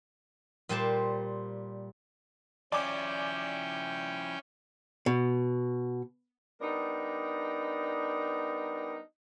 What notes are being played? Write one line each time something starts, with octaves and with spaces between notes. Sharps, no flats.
A#2 G3 C5 A5
F3 C#4 E4 D5 G5 G#5 D6
B2
G3 B3 D4 D#4 A#4